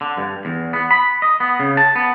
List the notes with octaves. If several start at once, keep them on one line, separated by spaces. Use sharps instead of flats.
D3
G2
E2
B3
B5
D#5
B3
C#3
A5
B3